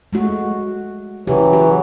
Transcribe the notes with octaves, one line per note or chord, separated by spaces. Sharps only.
G#3 A3 F#4
C#3 E3 F#3 G4
F#4